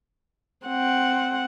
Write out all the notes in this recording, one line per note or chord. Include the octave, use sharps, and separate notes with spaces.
C4 F#5